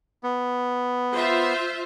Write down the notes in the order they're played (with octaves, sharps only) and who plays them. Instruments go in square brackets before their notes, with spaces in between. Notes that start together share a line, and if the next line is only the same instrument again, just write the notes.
[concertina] B3
[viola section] F4 C5 E5